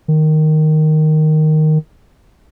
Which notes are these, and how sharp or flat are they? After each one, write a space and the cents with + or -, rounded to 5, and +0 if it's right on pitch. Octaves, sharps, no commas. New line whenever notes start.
D#3 -5